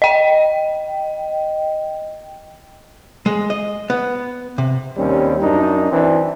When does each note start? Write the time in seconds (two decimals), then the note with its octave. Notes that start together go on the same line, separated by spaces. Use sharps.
0.02 D#5 G5
3.26 G#3
3.50 D#5
3.90 B3
4.58 C3
4.96 D#2 G3 C4 C#4
5.41 F#2 D4 D#4
5.90 E3 C4 D4